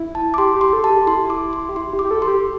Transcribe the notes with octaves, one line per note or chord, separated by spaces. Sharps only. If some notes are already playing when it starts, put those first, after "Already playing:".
Already playing: E4
A5
D6
G4 C6
G4
C6
A4
A5
G4
E4 C6
D6
C6
G4
E4 C6
G4
D6
G4
A4
C6
G4